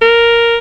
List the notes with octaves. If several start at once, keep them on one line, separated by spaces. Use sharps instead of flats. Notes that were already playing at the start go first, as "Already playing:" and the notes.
A#4